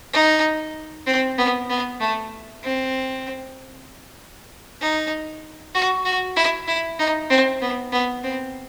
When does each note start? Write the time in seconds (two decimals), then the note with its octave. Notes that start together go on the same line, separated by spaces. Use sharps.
0.13 D#4
1.07 C4
1.38 B3
1.70 B3
2.00 A3
2.63 C4
4.81 D#4
5.75 F#4
6.05 F#4
6.37 E4
6.68 E4
6.99 D#4
7.30 C4
7.62 B3
7.92 B3
8.24 C4